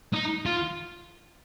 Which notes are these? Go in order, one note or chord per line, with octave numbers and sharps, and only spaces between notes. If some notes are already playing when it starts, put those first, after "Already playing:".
D#4
F4